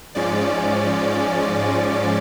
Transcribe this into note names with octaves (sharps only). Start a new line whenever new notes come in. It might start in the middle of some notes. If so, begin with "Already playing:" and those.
G#2 F3 G#3 C#4 D5